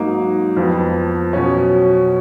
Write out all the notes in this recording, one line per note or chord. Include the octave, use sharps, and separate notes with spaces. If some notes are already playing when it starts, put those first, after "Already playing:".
Already playing: G#2 F#3 A#3 D#4
F2 F3 B3
B2 F#3 C#4